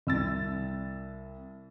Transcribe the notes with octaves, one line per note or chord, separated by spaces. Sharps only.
C2 E6 A6